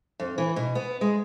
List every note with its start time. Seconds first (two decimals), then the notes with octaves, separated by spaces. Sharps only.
0.20 F2
0.38 E3
0.56 B2
0.75 B3
1.01 G#3